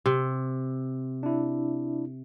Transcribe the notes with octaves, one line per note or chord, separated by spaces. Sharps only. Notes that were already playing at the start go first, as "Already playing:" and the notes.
C3
D4 E4